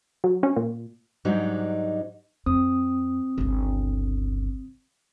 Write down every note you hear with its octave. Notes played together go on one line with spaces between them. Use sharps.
F#3
C#4
A#2
G#2 F#3 G3 D4 D#4
F2 C4 D#6
G1 C#2